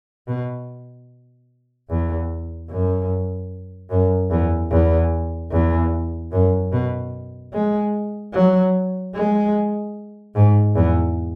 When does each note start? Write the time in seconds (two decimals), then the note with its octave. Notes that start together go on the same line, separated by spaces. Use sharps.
0.28 B2
1.89 E2
2.70 F#2
3.90 F#2
4.31 E2
4.71 E2
5.51 E2
6.32 F#2
6.72 B2
7.53 G#3
8.33 F#3
9.14 G#3
10.36 G#2
10.75 E2